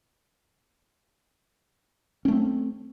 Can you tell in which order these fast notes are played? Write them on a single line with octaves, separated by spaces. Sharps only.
C#4 A3 C4